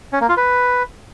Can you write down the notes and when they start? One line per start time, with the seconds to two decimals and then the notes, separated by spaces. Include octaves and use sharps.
0.13 C#4
0.21 A#3
0.29 F4
0.37 B4